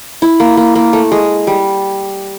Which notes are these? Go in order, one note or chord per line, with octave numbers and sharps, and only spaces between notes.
E4
A#3
A#3
A#3
A3
G#3
G3